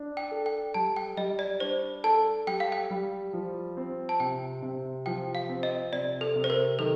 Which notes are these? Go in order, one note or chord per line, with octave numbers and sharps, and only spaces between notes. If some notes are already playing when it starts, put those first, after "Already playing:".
Already playing: D4
G5
A4
G5
G3 A5
G5
G3 D#5
D5
D4 C5
A4 A5
G3 G5
F5
G5
G3
F3
C4
A5
C3 G5
C3
F3 G5
F5
C4
D#5
C3 D5
A4
C3
C5
A#4
D#3 A4